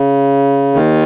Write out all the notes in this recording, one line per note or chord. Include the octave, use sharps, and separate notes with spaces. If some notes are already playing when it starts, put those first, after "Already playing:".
Already playing: C#3
D#2 D#3